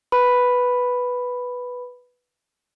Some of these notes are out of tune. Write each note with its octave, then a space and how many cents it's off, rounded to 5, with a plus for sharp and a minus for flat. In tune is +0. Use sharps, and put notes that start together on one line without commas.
B4 +0 B5 +0